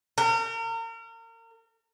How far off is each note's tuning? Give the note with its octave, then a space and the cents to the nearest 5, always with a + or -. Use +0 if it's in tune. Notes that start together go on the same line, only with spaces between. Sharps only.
A#4 -35